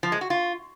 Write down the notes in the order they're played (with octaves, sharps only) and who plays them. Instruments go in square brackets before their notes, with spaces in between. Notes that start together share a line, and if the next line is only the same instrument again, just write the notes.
[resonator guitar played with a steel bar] F3
G#3
F#4
F4